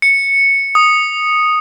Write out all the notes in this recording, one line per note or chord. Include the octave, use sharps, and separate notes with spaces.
C#7
D#6